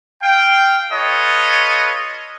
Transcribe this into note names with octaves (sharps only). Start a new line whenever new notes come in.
F5 G5
F4 A4 B4 C#5 D#5